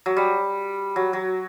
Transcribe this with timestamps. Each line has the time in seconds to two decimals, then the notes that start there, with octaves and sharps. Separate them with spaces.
0.06 F#3
0.17 G3
0.96 F#3
1.13 F#3